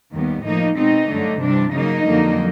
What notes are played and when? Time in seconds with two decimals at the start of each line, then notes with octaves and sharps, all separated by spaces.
0.14 D#2 D#3 G3 B3
0.46 A2 F3 A#3 D#4
0.78 B2 G#3 C4 D#4
1.10 G2 D3 F#3 A3 D4
1.42 C3 E3 G3 D4
1.73 C#3 F#3 A#3 D#4
2.05 F2 D3 F#3 A#3